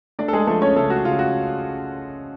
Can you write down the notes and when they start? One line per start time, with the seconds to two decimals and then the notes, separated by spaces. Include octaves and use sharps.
0.19 A3 D4 D5
0.28 A4
0.33 G#3 G#4
0.47 F3 A3 A4
0.62 C#4 C#5
0.76 C#3 A3 A4
0.90 F#4
1.05 C#3 F4
1.19 F#4